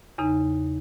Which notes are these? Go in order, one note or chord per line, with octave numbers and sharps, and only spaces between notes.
E2 C#3 D#4